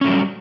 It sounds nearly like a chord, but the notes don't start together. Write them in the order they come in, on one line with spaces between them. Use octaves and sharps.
C#4 A3 F#3 G3